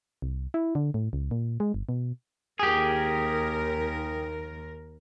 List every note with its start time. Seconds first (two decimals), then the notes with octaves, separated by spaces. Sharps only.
0.22 C2
0.54 E4
0.75 D3
0.94 A2
1.13 C#2
1.31 A#2
1.60 G#3
1.74 G1
1.89 B2
2.59 D#2 G4 G#4 A#4